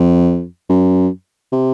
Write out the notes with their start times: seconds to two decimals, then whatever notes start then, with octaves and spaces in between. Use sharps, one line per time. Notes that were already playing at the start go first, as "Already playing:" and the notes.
Already playing: F2
0.69 F#2
1.52 C3